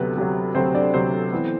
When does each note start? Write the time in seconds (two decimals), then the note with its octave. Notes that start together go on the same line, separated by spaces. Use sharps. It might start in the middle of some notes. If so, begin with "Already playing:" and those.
Already playing: D2 C3 F#3 B3 B4
0.17 D2 C3 F#3
0.55 D2 C3 F#3 C4 C5
0.75 D4 D5
0.94 D2 C3 F#3 C4 C5
1.32 E3 B3